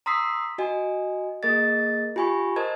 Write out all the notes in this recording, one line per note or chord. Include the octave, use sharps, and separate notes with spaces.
A#5 C6 D#6 E6 B6 C7
F#4 D#5 G#5
A#3 G#4 A#4 D#5 A6
F4 G4 G#5 B5 C#6
A#4 C5 D#5 A5 G#6